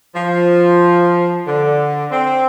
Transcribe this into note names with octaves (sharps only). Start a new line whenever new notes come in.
F3
D3
C4